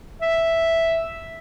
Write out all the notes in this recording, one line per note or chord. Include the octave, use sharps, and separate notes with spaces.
E5